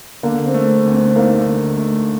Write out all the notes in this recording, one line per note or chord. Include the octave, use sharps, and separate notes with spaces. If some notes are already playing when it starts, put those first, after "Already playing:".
D3 A#3
C4
A3
D2
C4
A#3 D#4
D3
A3